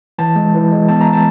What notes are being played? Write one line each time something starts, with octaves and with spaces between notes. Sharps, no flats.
E3 A5
G#3
E3
G#3
B3 A5
A#5
A5